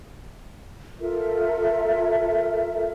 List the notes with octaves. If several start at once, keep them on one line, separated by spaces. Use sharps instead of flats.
F4 A4 A#4 E5